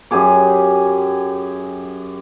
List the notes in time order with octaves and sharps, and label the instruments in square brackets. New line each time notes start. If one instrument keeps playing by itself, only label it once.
[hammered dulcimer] F#2 G4 G#4 D6